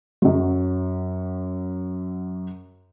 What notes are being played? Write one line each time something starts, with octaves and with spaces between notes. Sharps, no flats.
F#2 F#3